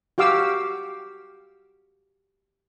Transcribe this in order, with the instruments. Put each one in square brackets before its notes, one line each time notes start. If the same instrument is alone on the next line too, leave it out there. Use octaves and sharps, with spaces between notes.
[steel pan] F#4 G4 F5 D6 E6